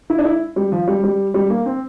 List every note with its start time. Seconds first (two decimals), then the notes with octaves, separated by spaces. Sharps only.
0.10 E4
0.18 D4
0.25 E4
0.56 G3
0.72 F3
0.87 G3
1.04 G3
1.34 G3
1.50 A#3
1.66 C4